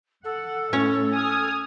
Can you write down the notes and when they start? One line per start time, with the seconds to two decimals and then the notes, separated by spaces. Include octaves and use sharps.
0.25 A4 F#5
0.73 A2 C#4 C#5
1.14 G#5 D#6 F6